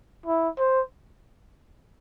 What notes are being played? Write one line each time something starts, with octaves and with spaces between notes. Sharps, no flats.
E4
C5